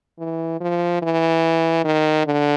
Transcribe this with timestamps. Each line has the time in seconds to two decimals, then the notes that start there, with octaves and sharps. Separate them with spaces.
0.19 E3
0.61 F3
1.02 E3
1.84 D#3
2.26 D3